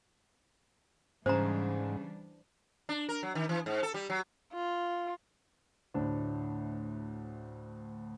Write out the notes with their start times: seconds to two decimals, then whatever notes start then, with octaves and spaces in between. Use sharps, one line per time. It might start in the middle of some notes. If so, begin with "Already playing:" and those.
1.26 G#2 C#3 E3 G3 D4 C5 A#5
2.89 D4
3.09 A#4
3.23 F#3
3.35 D#3
3.49 E3
3.66 G#2
3.83 A4
3.94 G3
4.10 F#3
4.53 F4
5.94 D2 A2 D4 C5